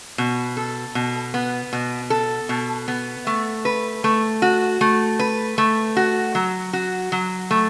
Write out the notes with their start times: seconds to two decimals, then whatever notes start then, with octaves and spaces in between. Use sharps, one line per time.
0.18 B2
0.57 A4
0.95 B2
1.34 B3
1.73 B2
2.10 A4
2.49 B2
2.88 B3
3.27 A3
3.65 B4
4.04 A3
4.42 F#4
4.81 A3
5.19 B4
5.58 A3
5.97 F#4
6.35 F#3
6.73 F#4
7.12 F#3
7.51 A3